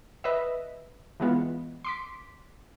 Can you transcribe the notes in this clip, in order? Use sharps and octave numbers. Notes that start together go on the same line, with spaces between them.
B4 D#5 E5
E3 G#3 B3 F4
C6 D6 B6